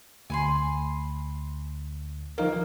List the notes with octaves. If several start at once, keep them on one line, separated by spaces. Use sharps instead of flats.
D2 G#5 B5 C6
F3 A#3 D#4 A#4